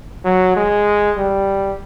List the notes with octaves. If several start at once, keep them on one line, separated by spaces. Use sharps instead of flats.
F#3
G#3
G3